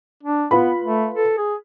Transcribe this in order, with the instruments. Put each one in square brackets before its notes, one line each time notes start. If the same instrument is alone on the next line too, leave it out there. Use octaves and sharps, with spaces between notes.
[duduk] D4
[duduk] B3 [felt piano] F4 B4 B5
[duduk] A3
A4
G#4